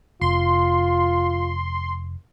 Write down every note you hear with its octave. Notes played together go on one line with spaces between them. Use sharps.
F1 F4 C6